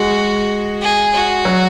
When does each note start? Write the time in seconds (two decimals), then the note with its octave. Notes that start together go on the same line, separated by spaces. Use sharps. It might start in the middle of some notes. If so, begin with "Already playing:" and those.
Already playing: G#3 F#4
0.82 G#4
1.14 F#4
1.45 F#3